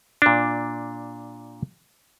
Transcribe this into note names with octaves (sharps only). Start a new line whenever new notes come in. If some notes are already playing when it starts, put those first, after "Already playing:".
A#2 D4